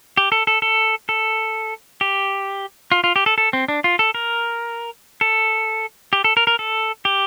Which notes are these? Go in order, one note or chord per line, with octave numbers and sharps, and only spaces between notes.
G4
A4
A4
A4
A4
G4
F4
F4
G4
A4
A4
C4
D4
F4
A4
A#4
A4
G4
A4
A#4
A#4
A4
G4